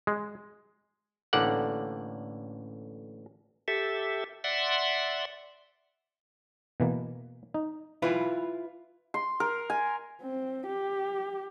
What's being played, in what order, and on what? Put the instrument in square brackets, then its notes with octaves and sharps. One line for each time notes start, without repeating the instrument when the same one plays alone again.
[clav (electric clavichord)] G#3
A1 A2 D3 A#3 D5 F#5
[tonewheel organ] G4 A4 E5
D5 E5 F#5 C6
[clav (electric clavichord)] B2 E3 A#3
D#4
[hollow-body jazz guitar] E4 F4 B4
[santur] C6
A#4
G#5
[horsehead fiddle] C4
G4